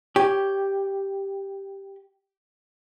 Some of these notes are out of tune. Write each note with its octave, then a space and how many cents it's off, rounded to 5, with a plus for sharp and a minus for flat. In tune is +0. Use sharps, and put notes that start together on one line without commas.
G4 +0 C#5 +0